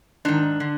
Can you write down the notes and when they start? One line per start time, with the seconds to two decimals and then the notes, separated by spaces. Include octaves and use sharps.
0.25 G#2 D#3 D4
0.60 D3